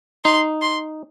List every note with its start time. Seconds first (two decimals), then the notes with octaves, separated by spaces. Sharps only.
0.24 D#4 C6
0.62 C6